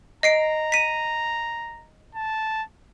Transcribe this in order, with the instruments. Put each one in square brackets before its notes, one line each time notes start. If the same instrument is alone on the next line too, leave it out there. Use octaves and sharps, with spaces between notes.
[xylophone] D#5 C7 D7 [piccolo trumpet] A#5
[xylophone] B6 D#7
[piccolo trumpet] A5